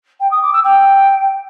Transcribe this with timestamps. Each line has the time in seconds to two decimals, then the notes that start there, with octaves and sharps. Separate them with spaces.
0.20 G5
0.31 D#6
0.42 D6
0.53 E6
0.64 G5